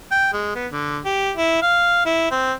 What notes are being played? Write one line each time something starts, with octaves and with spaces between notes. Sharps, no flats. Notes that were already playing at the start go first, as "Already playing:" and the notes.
G5
G#3
B3
D3
G4
E4
F5
E4
C4